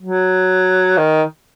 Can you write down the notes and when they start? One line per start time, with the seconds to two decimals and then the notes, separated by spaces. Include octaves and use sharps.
0.01 F#3
0.97 D#3